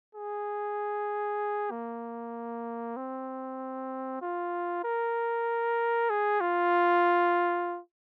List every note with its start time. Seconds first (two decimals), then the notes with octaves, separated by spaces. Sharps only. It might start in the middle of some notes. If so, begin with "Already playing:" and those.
0.15 G#4
1.71 A#3
2.96 C4
4.22 F4
4.84 A#4
6.10 G#4
6.41 F4